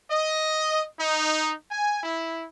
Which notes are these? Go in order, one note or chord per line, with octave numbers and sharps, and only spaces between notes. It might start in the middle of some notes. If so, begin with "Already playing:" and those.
D#5
D#4
G#5
E4